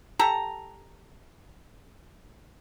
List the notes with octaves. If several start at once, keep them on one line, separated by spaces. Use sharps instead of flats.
G4 A4 A#5